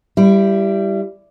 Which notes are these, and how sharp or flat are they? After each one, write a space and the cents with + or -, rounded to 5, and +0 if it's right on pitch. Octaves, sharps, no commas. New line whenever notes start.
G3 +0 E4 +25